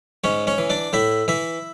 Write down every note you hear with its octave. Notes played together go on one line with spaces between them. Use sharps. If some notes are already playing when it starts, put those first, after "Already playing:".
G#2 C#4 C#5
C#4 C#5
E3
D4 D5
A2 E4 E5
E3 E4 E5